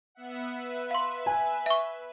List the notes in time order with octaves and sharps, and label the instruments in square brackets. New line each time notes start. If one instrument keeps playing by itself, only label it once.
[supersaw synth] B3 E5 F#5
B4 E5
[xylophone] F5 C6
[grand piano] G#5
[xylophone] E5 C#6